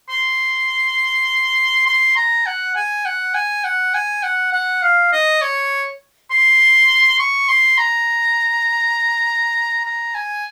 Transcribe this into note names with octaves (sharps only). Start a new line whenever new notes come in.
C6
C6
A#5
F#5
G#5
F#5
G#5
F#5
G#5
F#5
F#5
F5
D#5
C#5
C6
C#6
C6
A#5
A#5
G#5